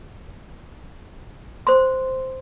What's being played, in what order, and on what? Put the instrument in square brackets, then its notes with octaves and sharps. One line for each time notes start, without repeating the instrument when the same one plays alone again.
[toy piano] C5 C6